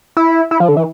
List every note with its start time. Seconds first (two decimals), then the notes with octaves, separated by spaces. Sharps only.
0.17 E4
0.51 E4
0.60 F3
0.69 D3
0.77 E3